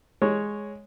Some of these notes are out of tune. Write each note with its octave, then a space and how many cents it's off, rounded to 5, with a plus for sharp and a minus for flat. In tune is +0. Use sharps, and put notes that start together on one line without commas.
G#3 +0 C#5 +0